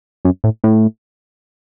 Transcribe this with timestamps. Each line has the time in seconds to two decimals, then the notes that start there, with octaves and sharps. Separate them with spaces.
0.25 F#2
0.44 A2
0.64 A2